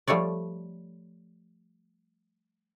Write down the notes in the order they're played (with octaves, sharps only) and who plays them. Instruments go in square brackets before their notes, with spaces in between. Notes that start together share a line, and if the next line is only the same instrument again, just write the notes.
[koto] F3 G3 A3 C#5 D5